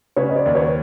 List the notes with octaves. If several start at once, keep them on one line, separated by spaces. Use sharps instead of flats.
C#3 B4 C#5
D#5
C5 D5
D#2
B4 C#5